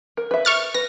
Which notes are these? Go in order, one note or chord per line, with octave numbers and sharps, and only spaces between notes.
A#4
B4 E5
C#6 F6 A6
B4 A#6